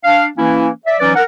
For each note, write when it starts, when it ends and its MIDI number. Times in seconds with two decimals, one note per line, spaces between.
0.04 0.24 62
0.04 0.24 77
0.37 0.67 52
0.37 0.67 58
0.37 0.67 61
0.37 0.67 64
0.85 0.95 74
0.85 0.95 76
1.00 1.12 52
1.00 1.12 54
1.00 1.12 61
1.00 1.12 63
1.00 1.12 71
1.00 1.12 74
1.15 1.22 70
1.15 1.22 78